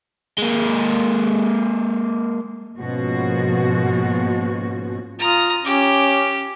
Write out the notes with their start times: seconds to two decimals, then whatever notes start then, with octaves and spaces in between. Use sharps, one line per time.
0.38 G#3 A#3
2.80 G#2 B2 F3 A#3 C#4 F#4
5.19 F4 A#5 D#6
5.65 C#4 G4 D6